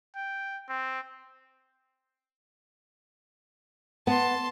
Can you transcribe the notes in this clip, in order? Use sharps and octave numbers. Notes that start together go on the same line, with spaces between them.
G5
C4
B3 A5 C6